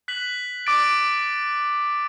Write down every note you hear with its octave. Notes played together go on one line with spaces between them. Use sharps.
F#6 B6 F#7
D6 A6 D7